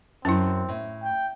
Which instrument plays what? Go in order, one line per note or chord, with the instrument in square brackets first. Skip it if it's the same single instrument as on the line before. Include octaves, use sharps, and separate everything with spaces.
[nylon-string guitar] F#2 [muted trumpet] C4 [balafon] C#4 E4
[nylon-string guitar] A2
[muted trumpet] G5